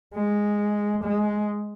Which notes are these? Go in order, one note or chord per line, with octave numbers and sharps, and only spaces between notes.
G#3
G#3